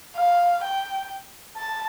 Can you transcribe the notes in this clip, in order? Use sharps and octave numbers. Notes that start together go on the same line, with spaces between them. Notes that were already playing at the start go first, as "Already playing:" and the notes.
F5
G5
A5